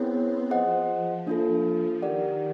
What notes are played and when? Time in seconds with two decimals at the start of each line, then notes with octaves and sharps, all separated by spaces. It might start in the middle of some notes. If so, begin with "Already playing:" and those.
Already playing: B3 C4 E4 G#4 C#5
0.51 F3 G#4 C5 D#5 F#5
1.27 A#3 D4 F4 A4
2.02 D#3 G4 A#4 D5 F#5